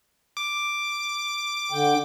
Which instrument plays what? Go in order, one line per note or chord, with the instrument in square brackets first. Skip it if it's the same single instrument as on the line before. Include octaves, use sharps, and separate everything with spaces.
[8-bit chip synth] D6
[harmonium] D3 G5